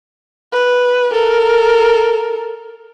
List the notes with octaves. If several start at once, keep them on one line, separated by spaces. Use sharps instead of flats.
B4
A4 A#4